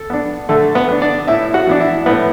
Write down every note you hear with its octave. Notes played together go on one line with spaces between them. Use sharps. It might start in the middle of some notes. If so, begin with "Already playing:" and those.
Already playing: A4
B3 D4
D3 A3 A4
B3 B4
B3 D4
D4 D5
A2 E4 E5
F#4 F#5
E3 B3 D4
E4 E5
A2 B3 B4